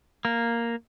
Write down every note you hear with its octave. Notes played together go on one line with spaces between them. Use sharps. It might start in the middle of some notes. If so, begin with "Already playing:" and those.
A#3